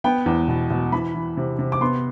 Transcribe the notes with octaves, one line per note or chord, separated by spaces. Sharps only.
B3 G5
E2
B2
B2
E3 B5
E3
C3
C3
D6
B3 C6